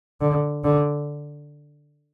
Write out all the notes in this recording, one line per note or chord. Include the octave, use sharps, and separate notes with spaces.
D3
D3